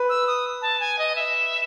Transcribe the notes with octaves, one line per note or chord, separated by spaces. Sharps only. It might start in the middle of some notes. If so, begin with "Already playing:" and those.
Already playing: B4
E6
D#6
A5
G#5
D#5
E5